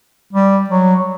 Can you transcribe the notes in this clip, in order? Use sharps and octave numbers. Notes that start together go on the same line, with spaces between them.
G3
F#3